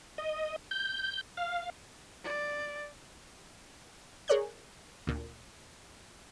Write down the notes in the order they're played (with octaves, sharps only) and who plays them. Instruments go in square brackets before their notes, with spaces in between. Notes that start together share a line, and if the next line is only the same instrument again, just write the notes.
[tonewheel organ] D#5
G6
F5
[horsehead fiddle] D5
[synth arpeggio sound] G#4 A#4 C#5 D5 F#6 G6
D2 A#2